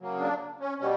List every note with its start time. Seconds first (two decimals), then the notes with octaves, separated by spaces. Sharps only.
0.01 C#3 F#3 A#3
0.20 D4
0.60 C#4
0.80 B2 G3 C#4